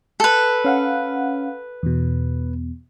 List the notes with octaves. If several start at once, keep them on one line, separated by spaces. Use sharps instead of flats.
A4 B4
C#4 F5 F#5
E2 B2